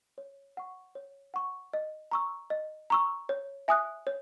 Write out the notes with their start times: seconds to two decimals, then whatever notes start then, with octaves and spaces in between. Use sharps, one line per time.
0.18 C#5
0.57 F#5 C#6
0.95 C#5
1.34 F#5 C#6
1.73 D#5
2.11 A#5 C#6 E6
2.50 D#5
2.90 A#5 C#6 E6
3.29 C#5
3.68 E5 G#5 D#6 F#6
4.07 C#5